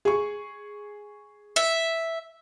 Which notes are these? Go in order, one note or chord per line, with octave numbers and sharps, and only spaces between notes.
G#4 C#6
E5